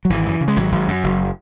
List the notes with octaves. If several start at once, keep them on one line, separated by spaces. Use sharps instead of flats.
F#3
G#1 E3
F#2
C#3
G#3
G#1 F#3
G#1
F#2
F#1